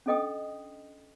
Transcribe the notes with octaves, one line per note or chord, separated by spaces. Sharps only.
C#4 D4 A4 D#5 G5 D#6